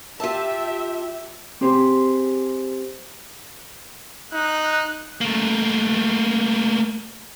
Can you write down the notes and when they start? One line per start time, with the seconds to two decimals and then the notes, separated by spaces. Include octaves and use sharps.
0.20 F4 G4 E5 A5
1.61 C4 G4 G#4 C5
4.33 D#4 F#6
5.21 A3 A#3